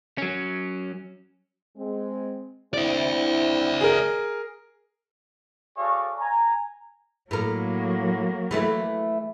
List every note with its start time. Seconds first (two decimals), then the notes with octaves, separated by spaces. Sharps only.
0.18 F#3 C#4
1.77 G#3 C4
2.74 C4 D4 E4 D5 E5
3.81 G#4 A#4
5.77 F#4 G#4 A4 C#5 D5 F5
6.18 G#5 A#5
7.31 A2 F#3 A#3 A#4
8.51 E3 A3 E4